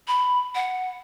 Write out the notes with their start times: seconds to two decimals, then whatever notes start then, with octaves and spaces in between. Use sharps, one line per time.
0.08 B5
0.55 F#5